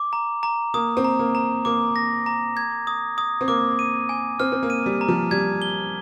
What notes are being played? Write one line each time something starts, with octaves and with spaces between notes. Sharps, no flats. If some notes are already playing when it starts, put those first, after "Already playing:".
Already playing: D6
A#5
A#5
A#3 D#6
C4
A#5
A#3
A#5
A#3 D6
A#6
A#5
G#6
D#6
D#6
C4
A#3 D6
D#7
G#5
C4 F6
C4
A#3
D#7
G3
A#5
F3
G3 G#6
G7